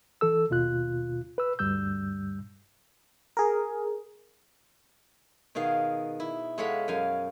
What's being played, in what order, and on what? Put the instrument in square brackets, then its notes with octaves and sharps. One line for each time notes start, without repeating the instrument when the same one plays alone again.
[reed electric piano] E3 A4 E6
D#2 B2 F4 F#6
B4 E6
D2 G2 G3 E6 G6
[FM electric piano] G#4 A#4
[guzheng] B2 D#3 G#4 F5
E4
G#3 A4 C#5 F5 F#5 B5
F#2 F5 G#5